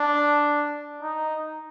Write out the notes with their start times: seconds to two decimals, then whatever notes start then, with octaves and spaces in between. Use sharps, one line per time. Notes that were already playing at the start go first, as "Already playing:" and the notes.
Already playing: D4
1.03 D#4